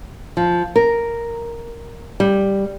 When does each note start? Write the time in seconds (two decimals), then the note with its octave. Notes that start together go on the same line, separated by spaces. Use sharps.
0.37 F3
0.76 A#4
2.20 G3